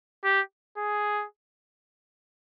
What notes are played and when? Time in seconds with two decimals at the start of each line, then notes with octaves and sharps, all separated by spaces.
0.24 G4
0.77 G#4